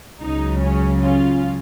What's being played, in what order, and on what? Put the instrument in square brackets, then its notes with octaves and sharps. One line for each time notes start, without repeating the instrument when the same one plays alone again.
[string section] C#2 C#3 F#3 D#4
C#4
C#4 F4